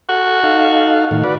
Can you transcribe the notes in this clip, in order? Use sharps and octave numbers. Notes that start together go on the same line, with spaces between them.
F#4 A4
D#4 A4 F5
A2 D#3
F#4 B4 D5